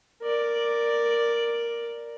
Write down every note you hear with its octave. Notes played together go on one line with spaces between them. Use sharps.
A#4 D5